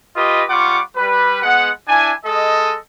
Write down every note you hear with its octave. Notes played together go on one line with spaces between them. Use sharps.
F4 G4 B4 D#5
G3 F4 F#5 C#6 D6
G3 B4
G#3 B3 F#5
D4 E4 G#5
G#3 A4 D#5